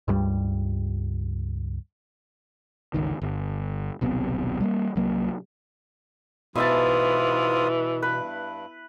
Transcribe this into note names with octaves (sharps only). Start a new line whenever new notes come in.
C#2 G2 G3
G1 C#2 D#3
G1
D#1 B1 C3 B3
G3 A3 A#3
C2 F#3 A#3
G#2 B2 E3 E4 F4 E5 A5 D#6
G2 B4